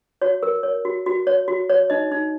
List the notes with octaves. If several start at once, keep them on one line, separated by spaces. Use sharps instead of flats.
F#4 C#5
A#4
C#5
F#4
F#4
C#5
F#4
C#5
D#4 D#5
D#4